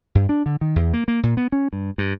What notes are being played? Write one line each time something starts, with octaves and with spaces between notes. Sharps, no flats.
G2
D4
D3
D#3
E2
A#3
A#3
A#2
B3
C#4
G2
G2